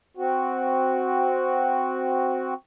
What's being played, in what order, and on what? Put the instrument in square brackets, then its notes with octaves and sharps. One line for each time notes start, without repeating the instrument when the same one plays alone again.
[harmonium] C4 F#4